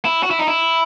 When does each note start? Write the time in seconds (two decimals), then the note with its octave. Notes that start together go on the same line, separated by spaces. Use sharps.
0.05 E4
0.23 F#4
0.31 E4
0.39 D#4
0.48 E4